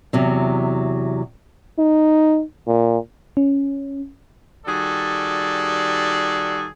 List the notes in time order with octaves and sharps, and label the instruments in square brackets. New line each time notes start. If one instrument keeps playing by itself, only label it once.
[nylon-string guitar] E2 C3 F#3
[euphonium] D#4
A#2
[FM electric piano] C#4
[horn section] D#3 G3 F#4 G#4 A4 D5